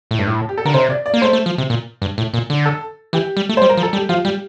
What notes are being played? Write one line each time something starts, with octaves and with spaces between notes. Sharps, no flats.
A2
G2
A2
G4
A4
D3 A#4
C3 C5
D5
D5
A#3
A3 C5
A3
F3
C3
A#2
G2
A2
A#2
D3
A4
E3 G4
G3
A3
G3 C5
A#4
F3
A4
G3
G4
F3 F4
G3 G4